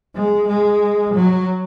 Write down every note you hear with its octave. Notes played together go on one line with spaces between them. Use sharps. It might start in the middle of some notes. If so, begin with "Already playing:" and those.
G#3
G#3
F#3